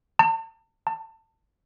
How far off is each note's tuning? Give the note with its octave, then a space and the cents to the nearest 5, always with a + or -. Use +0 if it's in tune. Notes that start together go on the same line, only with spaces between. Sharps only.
A5 +40
A5 +25